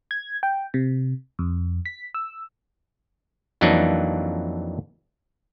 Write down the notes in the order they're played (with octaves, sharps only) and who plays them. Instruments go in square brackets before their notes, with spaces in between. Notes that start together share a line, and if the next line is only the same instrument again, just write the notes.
[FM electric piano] G#6
G5
C3
F2
B6
E6
[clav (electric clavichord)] F2 E3 F#3 A#3 D4 D#4